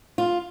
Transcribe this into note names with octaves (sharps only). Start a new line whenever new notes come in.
F4